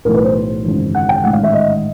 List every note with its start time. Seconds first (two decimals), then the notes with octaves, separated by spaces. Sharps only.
0.05 B1 A2 E3 A#4
0.14 B4
0.24 C5
0.64 G#1 F#2 C#3 E3
0.95 F#5
1.09 G5
1.23 A1 G#2 D#3 F#5
1.33 F5
1.43 E5
1.53 D#5